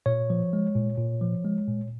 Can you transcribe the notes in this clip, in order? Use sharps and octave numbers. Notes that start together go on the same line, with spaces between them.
A#2 C#5
F3
G#3
A#2
A#2
F3
G#3
A#2